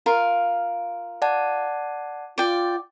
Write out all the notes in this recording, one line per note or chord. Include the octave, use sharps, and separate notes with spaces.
F4 A#4 F5
D5 F#5 A5
F4 D5 G5